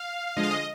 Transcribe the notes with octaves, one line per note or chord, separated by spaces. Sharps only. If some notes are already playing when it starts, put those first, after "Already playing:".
Already playing: F5
D3 F3 G#3 D#5
F5
D#5